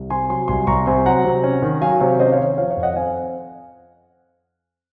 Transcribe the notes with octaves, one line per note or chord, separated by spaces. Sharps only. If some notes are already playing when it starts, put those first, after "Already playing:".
Already playing: C2
C3 G#5 C6
F#3 G#5 C6
C2 G#5 C6
C2 A#5 C#6
C3 G#5 C6
F#3 F#5 A#5
C3
C#4
D#3
F#3 F5 G#5
C3 C#5 F5
C#4 C5 D#5
C#5 F5
D#3 C5
C#5
F3 C#5 F5
C#5 F5
F2
D#5 F#5
C4 F5 G#5